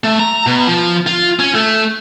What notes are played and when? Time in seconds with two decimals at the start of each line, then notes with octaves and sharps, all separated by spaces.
0.04 A3
0.20 A#5
0.47 B2
0.67 F3
1.06 F4
1.39 C#4
1.55 A3